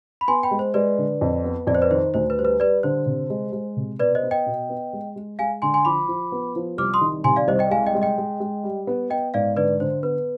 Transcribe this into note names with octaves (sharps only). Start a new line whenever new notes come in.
B5
B3 G#5 C6
G5 B5
G#3
C5
G#3 B4 D5
D3
F2
B3
F2 D5
C5
B4 D5
D#3 C5
D2 C5
B4
G3 C5
B4
G3 B4 D5
D3 C5
C3
G#3
G#3
C3
B2 B4 D5
C5 D#5
B3
D#5 G5
B2
B3
G#3
G#3
G#3 F5 G#5
D3 G#5 C6
G#5 C6
F3 B5 D6
F3
B3
F3
C2 D6 F6
C6 D#6
D#3
C3 G#5 C6
D5 F5
C2 C5 D#5
D#5 G5
G#3 F5 G#5
D#5 G5
G#3
D#5 G5
G#3
G#3
G3
B3
B3 D#5 G5
G#2 D5 F5
D3 B4 D5
D3 C5
B3 B4